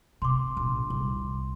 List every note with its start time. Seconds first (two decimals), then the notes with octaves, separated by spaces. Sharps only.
0.22 C3 C6 D6
0.57 A#1
0.90 C2